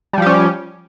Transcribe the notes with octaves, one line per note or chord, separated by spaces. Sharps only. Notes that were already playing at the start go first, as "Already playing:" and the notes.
F3 G3 C#4 G4